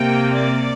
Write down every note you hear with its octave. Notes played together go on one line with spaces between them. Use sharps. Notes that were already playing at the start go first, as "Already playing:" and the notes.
Already playing: C3 A#3 G5
D5